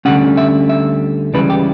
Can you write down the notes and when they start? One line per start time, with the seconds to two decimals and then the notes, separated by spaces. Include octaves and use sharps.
0.05 D2 D3 G3 C#4 F#5
0.37 E5
0.69 E5
1.34 C#2 C#3 E3 G3 B4
1.50 G4